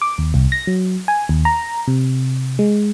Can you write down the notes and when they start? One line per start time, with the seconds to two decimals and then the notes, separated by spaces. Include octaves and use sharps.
0.02 D6
0.18 D#2
0.34 C2
0.52 A#6
0.67 F#3
1.08 G#5
1.29 D#2
1.45 A#5
1.87 C3
2.59 G#3